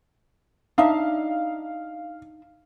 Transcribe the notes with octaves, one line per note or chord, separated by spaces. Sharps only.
D4 D#4 E5 F5